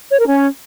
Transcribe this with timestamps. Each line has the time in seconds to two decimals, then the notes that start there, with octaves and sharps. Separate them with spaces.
0.10 C#5
0.19 A#4
0.27 C#4